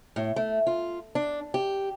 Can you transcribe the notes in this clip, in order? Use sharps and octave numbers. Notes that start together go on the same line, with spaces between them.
A2
A3
F4
D4
G4